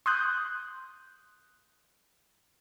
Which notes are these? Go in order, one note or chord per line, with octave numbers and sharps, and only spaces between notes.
C6 D#6 F#6 G6